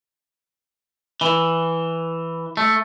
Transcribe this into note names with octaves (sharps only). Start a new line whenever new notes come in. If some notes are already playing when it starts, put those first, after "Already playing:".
E3
A3